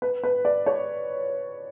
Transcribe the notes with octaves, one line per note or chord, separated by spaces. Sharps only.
B4
B4
D5
C#5